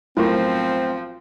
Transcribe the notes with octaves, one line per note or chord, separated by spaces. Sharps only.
B1 A2 F3 C4 E4 F4 A#4 C#6